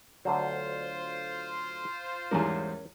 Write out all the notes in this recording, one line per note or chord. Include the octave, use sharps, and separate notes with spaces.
D2 D3 F#3 F4 C5
E2 G#2 G3 C#4 A#4